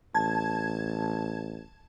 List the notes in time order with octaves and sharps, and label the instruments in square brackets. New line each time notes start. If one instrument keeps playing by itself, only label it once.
[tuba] A1 [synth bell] A5 G#6